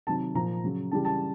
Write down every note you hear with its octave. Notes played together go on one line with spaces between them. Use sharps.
C3 D#3 F#3 A5
A#2 F3 A#5
C#3 F#3
C#3 E3 G3 A5
A5